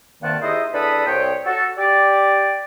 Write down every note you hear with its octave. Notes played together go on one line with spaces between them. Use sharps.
G2 C3 D#3 A#3 F#5 A5
D#4 E4 G4 G#4 C5 D#5
E2 D4 A4 B4 B5 D#6
C2 C4 C#5 G5
F#4 A4
G4 D5